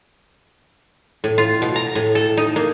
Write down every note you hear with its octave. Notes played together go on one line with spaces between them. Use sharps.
A2
F4
B2
A#5
A2
A4
D#4
A#3